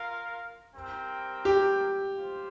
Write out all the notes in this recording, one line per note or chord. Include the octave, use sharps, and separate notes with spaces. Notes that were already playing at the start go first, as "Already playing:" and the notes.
Already playing: F4 A#4 F5
G3 C4 A#4 G5
G4
F4 C5